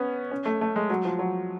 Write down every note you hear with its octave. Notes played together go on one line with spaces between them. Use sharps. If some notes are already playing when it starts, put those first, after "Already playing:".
Already playing: B3 C#4
C#4
A3
A3
G#3
F#3
F3
F#3